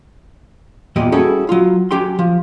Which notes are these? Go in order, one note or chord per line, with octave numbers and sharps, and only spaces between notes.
E2 A#2 G4 D#5
G3 C#4 E4 F#4 G#4 A4
F#3 F4
F#3 C#4 G4 G5 C6
F3